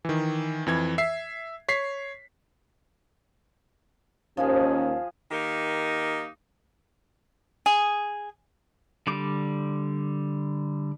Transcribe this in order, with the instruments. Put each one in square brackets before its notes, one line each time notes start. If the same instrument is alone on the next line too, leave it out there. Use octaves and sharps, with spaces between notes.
[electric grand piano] D#3 E3
F2 E3 G#6
E5 C7
C#5 B6 C7
[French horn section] D#2 C#4 [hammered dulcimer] F3 F4 G#4
[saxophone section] D#3 A#3 D#4 G4 A#4
[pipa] G#4
[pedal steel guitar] D3 G3 D6